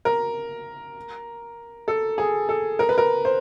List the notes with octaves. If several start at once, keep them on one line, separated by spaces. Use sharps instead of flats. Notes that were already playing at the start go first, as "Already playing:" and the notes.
A#4
A4
G#4
A4
A#4
B4
A#4
C5